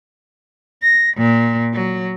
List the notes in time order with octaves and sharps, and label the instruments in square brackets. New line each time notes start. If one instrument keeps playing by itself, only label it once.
[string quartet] A#6
A#2
F#3